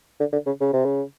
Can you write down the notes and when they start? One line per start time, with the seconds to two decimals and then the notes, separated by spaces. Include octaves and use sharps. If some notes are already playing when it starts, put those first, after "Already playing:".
0.20 D3
0.32 D3
0.46 C#3
0.61 C#3
0.73 C3
0.85 C#3